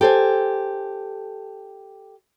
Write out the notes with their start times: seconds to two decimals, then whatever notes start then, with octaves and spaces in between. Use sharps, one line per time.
0.01 G4 A4 C5 G#5